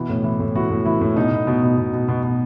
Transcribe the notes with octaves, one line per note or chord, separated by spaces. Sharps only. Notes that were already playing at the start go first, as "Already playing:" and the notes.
Already playing: B2 E3
A2
E3
A2
E3 F#4
A2
E3 E4
A2
B2 D#4
B2
B2
B2
B2
B2
B2
B2